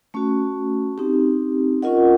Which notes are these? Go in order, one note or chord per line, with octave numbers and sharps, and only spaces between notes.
A3 C#4 F#4
C4 D#4 G4
C#4 F4 A#4 D#5 F#5